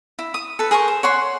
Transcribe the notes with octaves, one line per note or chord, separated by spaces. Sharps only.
E4
D#6
A4 B4
G#4 A#4 C5 C#6
C5
C#5 F#5 C6